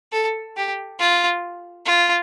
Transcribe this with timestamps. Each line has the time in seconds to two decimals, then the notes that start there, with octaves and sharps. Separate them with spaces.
0.12 A4
0.57 G4
0.99 F4
1.86 F4